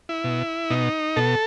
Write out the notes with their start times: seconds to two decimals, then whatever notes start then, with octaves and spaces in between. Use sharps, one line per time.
0.09 E4
0.24 B2
0.70 B2 D#4
1.16 B2 A4